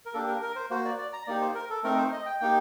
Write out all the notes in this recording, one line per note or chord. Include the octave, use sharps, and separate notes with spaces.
A#4
A#3 D4 G4 A4
A#4
A#4
C5
A#3 F#4 C5
D5
D5
A#5
A#3 D#4 G4 D5
C5
A#4
A4
A3 C4 D#4 A#4
C5
D#5
G5
A#3 D#4 G4 G5